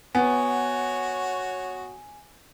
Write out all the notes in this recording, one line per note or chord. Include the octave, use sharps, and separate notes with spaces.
B3 F#4 C#5 G#5